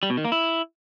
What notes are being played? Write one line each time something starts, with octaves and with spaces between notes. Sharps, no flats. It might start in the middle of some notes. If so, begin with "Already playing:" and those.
G3
B2
D#3
A#3
E4